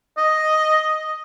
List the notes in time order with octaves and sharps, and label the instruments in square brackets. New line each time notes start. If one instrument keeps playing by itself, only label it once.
[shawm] D#5